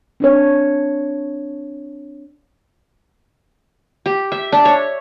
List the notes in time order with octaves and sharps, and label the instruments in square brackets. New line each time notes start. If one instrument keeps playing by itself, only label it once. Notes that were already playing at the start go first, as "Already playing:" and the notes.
[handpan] C4 D4 C#5
[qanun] G4
E5
D4
C#5